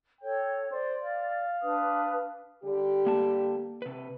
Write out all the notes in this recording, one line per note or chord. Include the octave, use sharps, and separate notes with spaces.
A4 C#5 G5
C5 D5
F5
D4 B4 D#6
D3 G3 G4
A#3 A5
C3 B4